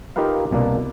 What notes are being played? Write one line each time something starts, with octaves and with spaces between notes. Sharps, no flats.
D#4 F4 G4 A#4 B4 F5
C2 B2 A#3 D4